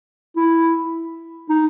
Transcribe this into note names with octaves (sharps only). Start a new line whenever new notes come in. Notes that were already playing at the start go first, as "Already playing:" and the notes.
E4
D#4